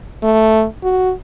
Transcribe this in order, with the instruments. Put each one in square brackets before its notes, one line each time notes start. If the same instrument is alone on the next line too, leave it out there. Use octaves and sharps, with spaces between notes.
[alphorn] A3
F#4